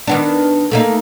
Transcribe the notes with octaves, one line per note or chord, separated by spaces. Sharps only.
D#3 B3 D4
A3 A#3 D#4